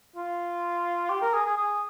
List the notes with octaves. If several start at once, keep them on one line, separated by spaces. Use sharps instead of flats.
F4
G4
A#4
G#4
G#4
G#4